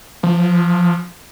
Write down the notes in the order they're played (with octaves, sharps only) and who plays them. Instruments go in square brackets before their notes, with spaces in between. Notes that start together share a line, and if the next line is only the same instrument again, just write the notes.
[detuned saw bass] F3